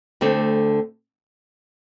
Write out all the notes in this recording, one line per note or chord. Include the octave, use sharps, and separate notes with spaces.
D2 D3 A3 C4